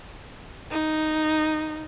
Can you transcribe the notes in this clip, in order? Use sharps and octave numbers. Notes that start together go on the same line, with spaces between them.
D#4